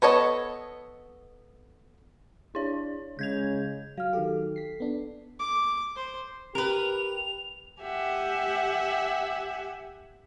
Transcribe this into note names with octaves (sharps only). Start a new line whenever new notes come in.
B3 A4 C#5 D#5
D4 E4 C#5
C#3 G#3 G6 G#6 F7
F#3 F5 F6
D#3 F#3 G4 A4
B6 C7
B3 D4
D6
C5
G4 A#4 B4 F7
G4 E5 F#5 G#5